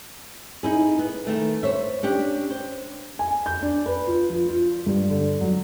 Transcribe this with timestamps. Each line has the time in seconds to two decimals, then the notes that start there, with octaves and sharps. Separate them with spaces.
0.63 D#4 E4 G#4
0.99 B3
1.27 D#3 A3
1.63 C5 C#5 E5
2.03 C#4 D4 G4
2.50 C5
3.19 G#5
3.46 G6
3.62 D4
3.86 B4
4.07 F4
4.30 F3
4.49 F4
4.86 G2
5.10 D3
5.41 F#3